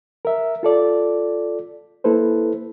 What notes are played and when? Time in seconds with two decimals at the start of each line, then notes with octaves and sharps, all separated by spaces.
0.25 A#4 E5
0.63 F4 A4 D5
2.04 A#3 E4 A4 B4 C5